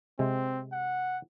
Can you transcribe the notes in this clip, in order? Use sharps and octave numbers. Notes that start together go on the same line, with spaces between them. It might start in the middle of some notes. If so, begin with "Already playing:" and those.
C3 G#3 C4
F#5